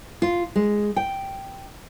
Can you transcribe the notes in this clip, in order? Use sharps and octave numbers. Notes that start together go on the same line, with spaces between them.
F4
G#3
G5